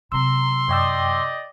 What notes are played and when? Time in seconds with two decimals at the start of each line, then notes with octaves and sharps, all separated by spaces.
0.12 C3 F#3 A#5 C6 E6
0.68 F#2 G4 D5 D#5 G5 E6